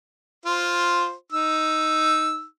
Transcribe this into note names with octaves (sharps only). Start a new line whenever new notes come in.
F4 C5
D#4 E6